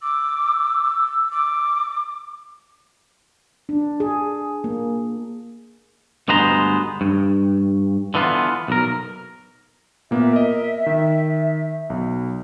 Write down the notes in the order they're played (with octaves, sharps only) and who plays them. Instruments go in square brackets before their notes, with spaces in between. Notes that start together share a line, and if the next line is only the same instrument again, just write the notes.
[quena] D6 [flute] E6
[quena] D6
[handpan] D4
G#4
A#3
[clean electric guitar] D2 G2 G#3 B3 C5 A#5
G2
D3 E3 B3 F4
B1 A#4
[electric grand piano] A#2 A#3 B3 [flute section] E5
[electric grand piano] A#4 D#5
D#3
B1